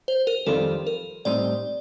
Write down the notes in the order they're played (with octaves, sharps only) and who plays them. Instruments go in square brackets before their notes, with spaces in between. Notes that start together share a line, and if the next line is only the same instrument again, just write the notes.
[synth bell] C5
A#4
[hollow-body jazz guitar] F2 D#3 G3 C4 F4 [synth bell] A4
[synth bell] A#4
[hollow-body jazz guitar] A2 G3 C4 D#4 [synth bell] D5